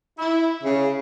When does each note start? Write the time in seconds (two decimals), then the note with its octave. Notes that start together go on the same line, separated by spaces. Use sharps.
0.19 E4
0.64 C#3